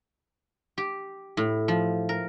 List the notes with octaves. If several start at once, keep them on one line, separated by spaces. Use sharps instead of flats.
G4
A2
F3
A#4